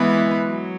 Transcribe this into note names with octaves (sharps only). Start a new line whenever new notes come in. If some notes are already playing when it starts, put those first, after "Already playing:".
Already playing: E3 G#3 B3 E4 B4
F#3